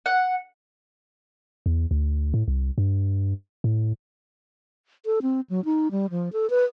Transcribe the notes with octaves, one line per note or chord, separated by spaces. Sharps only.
F#5
E2
D2
A2
C2
G2
A2
A4
C4
F#3
D#4
G3
F3
A4
B4